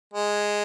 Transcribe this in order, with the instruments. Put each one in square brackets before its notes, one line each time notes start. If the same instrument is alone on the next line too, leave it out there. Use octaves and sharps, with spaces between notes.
[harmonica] G#3